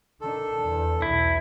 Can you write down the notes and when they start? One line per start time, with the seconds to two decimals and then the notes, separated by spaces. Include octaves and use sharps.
0.21 D#3 D4 A4
0.64 E2
1.02 B1 E2 E4